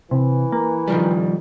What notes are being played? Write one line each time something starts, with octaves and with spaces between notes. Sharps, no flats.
C3 E3
A#3
D#3 F3 G3